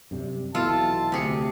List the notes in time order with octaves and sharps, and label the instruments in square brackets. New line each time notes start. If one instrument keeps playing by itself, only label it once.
[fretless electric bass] F#2 C3 G3
[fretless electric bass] B1 E3 [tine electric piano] B2 [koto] F4 A4 [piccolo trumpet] A5
[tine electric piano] D2 G4 C#7 [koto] C3 G#4